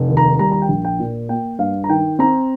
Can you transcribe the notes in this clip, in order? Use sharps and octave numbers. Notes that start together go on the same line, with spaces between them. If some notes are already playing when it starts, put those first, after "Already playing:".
Already playing: F1
D#2
A#5
G3 A#5
A#5
G5
A#1
G5
A#2
A#3 G5
G2 F5
A#5
D#3 G5
C4 A#5